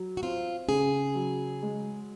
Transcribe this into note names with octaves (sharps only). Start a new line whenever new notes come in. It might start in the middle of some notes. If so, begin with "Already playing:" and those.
Already playing: F#3
F#4
C4 F4
C#3 G#4
F#3
G#3